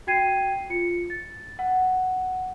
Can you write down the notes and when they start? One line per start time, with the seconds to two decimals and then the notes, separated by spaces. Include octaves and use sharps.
0.07 F#4 G5 G#6 C7 D#7
0.70 F4 C#7
1.10 A6
1.59 F#5